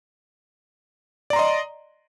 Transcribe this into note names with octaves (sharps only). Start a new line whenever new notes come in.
D5 D#5 A#5 C6